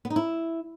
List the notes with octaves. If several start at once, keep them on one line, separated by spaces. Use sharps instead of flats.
B3
D#4
E4